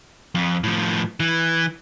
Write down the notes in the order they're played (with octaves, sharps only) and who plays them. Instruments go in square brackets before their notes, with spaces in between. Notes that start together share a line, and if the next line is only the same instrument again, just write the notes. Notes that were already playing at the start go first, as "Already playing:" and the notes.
[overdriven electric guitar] F2
A2 F3
E3